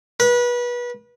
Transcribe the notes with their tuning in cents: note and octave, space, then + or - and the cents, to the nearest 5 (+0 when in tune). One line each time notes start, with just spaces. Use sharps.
B4 -30